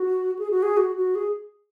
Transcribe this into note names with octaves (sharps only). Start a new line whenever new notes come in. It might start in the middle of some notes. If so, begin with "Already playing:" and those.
Already playing: F#4
G#4
F#4
G#4
F#4
F#4
G#4